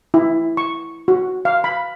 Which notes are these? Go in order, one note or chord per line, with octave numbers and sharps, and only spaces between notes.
E4
C#6
F#4
F5
B5